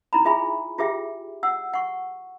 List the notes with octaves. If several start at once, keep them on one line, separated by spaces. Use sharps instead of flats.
D#4 E4 A#5 B5
F4 G#4 E5 G#5 B5
F4 G4 G#4 E5 G5
F#5 E6
F#5 C#6